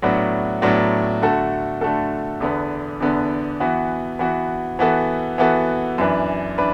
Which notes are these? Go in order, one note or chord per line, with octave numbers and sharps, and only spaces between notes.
A2 F#3 B3 D4 F#4
A2 F#3 B3 D4 F#4
D3 A3 F#4 A4
D3 A3 F#4 A4
E2 D3 B3
E2 D3 B3
E3 B3 F#4
E3 B3 F#4
E3 B3 F#4 A4
E3 B3 F#4 A4
F#2 E3 D4 B4
E3 D4 B4